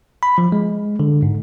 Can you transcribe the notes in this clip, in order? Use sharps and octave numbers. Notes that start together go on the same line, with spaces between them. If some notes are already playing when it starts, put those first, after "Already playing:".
B5
F3
G#3
D3
G#2